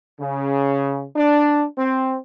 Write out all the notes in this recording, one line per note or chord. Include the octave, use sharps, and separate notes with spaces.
C#3
D4
C4